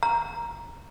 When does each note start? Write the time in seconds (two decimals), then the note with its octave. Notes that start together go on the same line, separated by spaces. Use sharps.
0.03 A#5